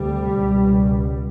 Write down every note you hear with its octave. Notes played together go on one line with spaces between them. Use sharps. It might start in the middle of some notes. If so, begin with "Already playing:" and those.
Already playing: D2 C3 G3
C#2 B2